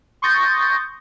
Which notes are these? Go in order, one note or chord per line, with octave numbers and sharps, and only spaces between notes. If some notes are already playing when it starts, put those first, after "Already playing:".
C6 C#6 D#6 G6 A6 A#6